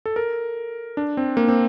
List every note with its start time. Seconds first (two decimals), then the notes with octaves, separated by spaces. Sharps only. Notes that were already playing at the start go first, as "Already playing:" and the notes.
0.06 A4
0.16 A#4
0.97 D4
1.17 C4
1.37 A#3
1.48 C4